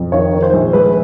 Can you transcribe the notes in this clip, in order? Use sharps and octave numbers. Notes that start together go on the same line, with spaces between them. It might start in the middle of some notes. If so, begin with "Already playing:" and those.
Already playing: F2
D#3 C#5
D#3
C5
A#1
G#3 B4